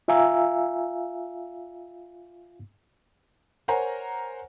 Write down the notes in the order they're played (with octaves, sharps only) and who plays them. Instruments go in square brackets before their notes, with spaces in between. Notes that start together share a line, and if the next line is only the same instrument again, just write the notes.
[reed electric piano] F4 E5 F5 G#5 A#5 E6
[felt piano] A#4 C5 C#5 F#5 G#5 A#5